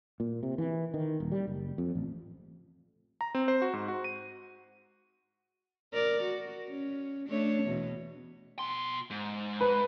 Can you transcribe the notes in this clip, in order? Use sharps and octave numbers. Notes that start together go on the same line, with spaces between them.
A#2
C3
E3
D#3
D#1
G3
F#1
F2
A1
A#5
C4
C5
F#4
G#2
F#4
D#7
A#4 D5
F#4
C#4
A3 D4 C#5
E2 B2
B2 C6
G#2
B4